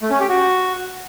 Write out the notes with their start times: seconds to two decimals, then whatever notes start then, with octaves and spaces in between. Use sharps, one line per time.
0.01 A3
0.10 C#4
0.20 G4
0.29 F#4